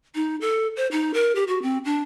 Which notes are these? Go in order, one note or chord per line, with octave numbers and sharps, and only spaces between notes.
D#4
A4
C5
D#4
A#4
G4
F#4
C4
D4